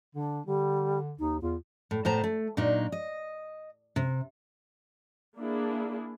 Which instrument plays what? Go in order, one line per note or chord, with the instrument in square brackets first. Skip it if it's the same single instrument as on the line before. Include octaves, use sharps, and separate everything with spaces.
[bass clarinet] D3 [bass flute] D4
[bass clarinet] D3 [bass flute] G3
[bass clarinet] D#2 [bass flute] D#4
[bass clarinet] E2 [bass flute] F4
[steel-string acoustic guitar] A2
A2 B3 C5 A5 A#5
A3
A#2 F#3 D4 D#4
D#5
C3
[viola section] A#3 D4 E4 G#4